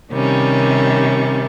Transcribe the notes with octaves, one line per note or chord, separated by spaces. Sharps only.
C3 D#3 G3 C#4